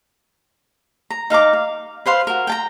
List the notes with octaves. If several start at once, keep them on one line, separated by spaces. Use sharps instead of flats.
A#5
D#4 F5 A#5 D6
F5
B4 C5 F5 C6
F#4 A#4
G5 A5 A#5